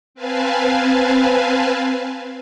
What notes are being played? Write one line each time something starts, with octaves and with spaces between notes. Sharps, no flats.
C4 B4 F5 G#5 A5